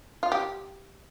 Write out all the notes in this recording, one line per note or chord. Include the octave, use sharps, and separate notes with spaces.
F4
G4